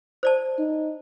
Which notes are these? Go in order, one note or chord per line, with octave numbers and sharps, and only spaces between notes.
C5 D5 A5
D#4